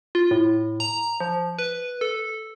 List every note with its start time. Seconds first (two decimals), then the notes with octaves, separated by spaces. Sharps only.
0.15 F4
0.31 A2
0.80 A#5
1.20 F3
1.59 B4
2.01 A4